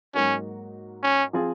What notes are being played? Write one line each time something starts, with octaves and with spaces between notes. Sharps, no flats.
G#2 F#3 A#3 C#4 D#4 F#4
C#4
F3 C4 F4 G#4